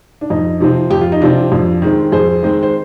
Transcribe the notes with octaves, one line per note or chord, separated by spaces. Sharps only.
D4
F2 D#4
C3 F3 C4
F2 G4
F4
D#4
C3 F3 C4 D4 F4
F2
D#3 G#3 C4
F2 G#4 C5
D#3 G#3 C4
C5